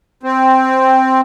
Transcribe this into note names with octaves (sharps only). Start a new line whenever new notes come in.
C4